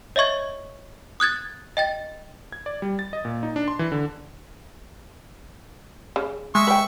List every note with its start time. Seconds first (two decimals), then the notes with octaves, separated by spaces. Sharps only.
0.16 C#5 D#5 E5 C#6 G#6
1.20 D#6 F#6 G#6 A6
1.77 D#5 G5 A6
2.52 G#6
2.66 D5
2.82 G3
2.99 A6
3.13 D#5
3.25 A#2
3.43 D#4
3.56 D4
3.68 C6
3.79 E3
3.92 D3
6.16 C#3
6.55 G#3 E5 C#6
6.67 B4 G5